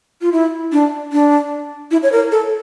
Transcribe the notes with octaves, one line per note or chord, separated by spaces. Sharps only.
F4
E4
D4
D4
E4
C#5
A#4
A4